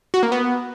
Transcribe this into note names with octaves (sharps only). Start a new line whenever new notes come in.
F#4
A#3
B3